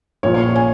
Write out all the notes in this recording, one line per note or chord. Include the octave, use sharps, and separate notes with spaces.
A#1 A#2 F3 C#5
C#5
G#5